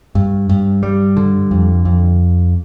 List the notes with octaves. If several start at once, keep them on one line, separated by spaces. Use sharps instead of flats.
G2
G2
G3
D3
F2
F2